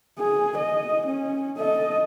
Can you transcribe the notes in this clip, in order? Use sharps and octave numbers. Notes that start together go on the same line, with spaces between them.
G#4
D#5
C#4
A4 D#5